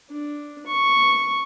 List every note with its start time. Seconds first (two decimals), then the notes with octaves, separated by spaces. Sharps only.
0.10 D4
0.66 C#6